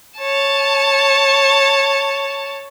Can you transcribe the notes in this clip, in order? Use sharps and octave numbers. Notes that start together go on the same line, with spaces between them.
C#5 A5